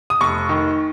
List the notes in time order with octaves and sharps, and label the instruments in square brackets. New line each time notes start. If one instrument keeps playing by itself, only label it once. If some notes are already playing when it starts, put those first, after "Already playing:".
[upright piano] D#6
F1 C#6
D#3